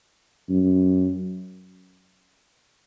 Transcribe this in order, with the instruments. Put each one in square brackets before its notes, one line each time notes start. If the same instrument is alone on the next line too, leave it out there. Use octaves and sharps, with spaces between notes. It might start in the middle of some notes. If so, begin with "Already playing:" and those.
[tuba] F#2